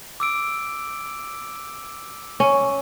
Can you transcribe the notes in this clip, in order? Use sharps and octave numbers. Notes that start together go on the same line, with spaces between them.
D6 E6 D7
C#4